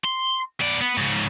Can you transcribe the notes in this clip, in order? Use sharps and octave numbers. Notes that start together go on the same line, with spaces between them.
C6
B3 D5
B3
G#2 C#3